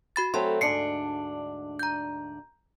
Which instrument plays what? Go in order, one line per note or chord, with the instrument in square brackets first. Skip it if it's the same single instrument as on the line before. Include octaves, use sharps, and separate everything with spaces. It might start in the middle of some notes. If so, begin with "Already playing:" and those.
[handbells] F#4 B5 A6
[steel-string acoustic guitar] F#3 A3 C4 [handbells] C6
[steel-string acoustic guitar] D2 G#2 D4 [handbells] C7 C#7
[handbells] A#5 G6